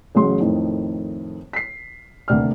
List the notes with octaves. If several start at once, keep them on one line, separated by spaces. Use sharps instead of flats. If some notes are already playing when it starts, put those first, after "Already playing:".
A1 C#3 F#3 C6
F2 A2 D#3
B6 C7
D#1 D2 C3 D5 F6